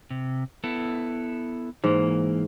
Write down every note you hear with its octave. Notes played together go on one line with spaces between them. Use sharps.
C3
B3 E4 A4
G#2 E3 A#3